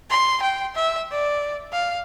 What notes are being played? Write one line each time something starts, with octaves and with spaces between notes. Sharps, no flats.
C6
G5
E5
D5
F5